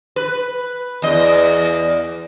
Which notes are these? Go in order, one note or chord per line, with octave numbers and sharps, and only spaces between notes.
B4
E2 D#5